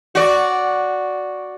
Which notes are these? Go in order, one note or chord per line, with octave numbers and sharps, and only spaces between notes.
F#4 D5